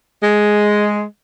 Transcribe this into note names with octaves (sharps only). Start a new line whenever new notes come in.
G#3